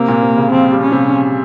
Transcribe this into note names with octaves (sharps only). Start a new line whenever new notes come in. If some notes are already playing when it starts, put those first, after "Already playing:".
Already playing: C3 A#3
A#2
C3
C#3
F3 C4
G3
C#4
C3